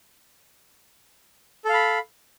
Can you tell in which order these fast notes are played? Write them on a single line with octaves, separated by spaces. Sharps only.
A4 F5 B5